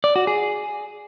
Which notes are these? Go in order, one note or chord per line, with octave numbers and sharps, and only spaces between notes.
D5
F#4
G#4